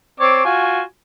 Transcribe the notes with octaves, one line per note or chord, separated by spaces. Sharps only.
C4 C#5 D5
F4 F#4 G#5